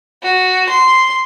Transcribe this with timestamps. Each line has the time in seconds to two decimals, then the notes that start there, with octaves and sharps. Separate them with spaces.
0.23 F#4
0.69 C6